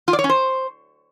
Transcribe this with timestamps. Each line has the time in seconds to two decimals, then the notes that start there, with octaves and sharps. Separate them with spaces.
0.08 F4
0.13 D5
0.19 C#5
0.24 C#4
0.29 C5